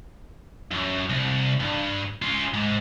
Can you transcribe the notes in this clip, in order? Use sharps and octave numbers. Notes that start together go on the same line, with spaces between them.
F#2
C2
G2
C#4 F4
G#2